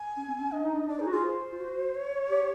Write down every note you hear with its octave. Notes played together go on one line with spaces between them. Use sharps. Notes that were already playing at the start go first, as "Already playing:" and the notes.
Already playing: G#5
C#4
C4
C#4
D4 D#5
D#4
D4
D4 D5
D#4 G#4
F#4
F4 G#4
C5
F4
F#4
C#5
G4